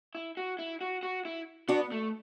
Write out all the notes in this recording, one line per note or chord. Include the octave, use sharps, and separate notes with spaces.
E4
F#4
E4
F#4
F#4
E4
B3 D4 F#4
A3